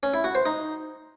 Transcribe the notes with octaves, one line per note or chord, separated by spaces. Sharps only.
C#4
E4
F#4
C5
D#4